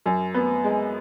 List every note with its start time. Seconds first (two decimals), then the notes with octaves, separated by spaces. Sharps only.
0.06 F#2
0.34 B3
0.64 G#3